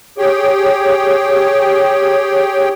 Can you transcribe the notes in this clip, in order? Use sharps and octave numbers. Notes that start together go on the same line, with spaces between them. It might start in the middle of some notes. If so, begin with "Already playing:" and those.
G4 G#4 C#5 G5